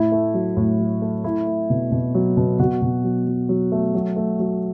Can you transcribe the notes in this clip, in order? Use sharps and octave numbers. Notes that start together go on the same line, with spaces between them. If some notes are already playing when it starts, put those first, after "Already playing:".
Already playing: A2 E4
A3
F#3
A2
F#3
A3
A3 E4
A3
B2
B2
F#3
B2
B2 F#4
B2
F#3
F#3
F#3
A3
F#3
A3
F#3